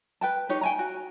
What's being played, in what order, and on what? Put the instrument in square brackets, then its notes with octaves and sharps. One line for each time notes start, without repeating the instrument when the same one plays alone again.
[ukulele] B4 G5 A5
D#4 G4 C#5
G5 G#5 A#5
F#4